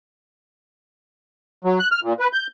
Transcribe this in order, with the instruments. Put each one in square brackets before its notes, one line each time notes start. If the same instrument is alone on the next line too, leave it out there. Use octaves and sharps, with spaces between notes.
[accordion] F#3
F#6
F6
A#2
B4
G6